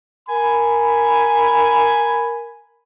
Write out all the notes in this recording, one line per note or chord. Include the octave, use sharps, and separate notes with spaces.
A#4 G#5 B5